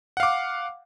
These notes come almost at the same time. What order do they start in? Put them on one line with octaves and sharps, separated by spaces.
F#5 F5 D6